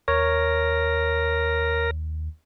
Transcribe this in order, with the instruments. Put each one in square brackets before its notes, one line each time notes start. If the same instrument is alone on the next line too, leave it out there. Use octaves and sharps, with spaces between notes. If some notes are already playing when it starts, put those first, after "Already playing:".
[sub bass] D#2 [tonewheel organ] A#4 [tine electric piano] C#5